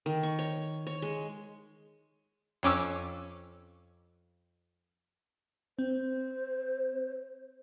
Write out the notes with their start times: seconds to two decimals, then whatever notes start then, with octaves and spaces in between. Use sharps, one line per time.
0.06 D#3
0.23 C#6
0.39 C#5
0.87 C#5
1.02 G#3
2.63 F2 C#4 D6 E6
5.79 C4 C5